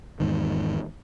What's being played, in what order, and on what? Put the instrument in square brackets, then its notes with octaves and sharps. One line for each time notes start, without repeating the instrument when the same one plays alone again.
[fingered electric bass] E2 G#2 D#3